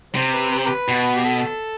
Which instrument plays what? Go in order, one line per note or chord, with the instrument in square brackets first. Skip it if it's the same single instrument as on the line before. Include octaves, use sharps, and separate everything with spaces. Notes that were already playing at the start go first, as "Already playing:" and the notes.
[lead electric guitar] C3 [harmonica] C5
[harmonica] B4
B4
C5
G4 B4
[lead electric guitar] B2
[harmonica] G4
A4